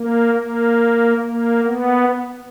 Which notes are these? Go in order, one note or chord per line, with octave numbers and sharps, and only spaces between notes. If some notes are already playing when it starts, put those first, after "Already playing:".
Already playing: A#3
A#3
A#3
B3